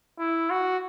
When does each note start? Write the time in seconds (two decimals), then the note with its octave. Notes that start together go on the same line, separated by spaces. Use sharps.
0.19 E4
0.50 F#4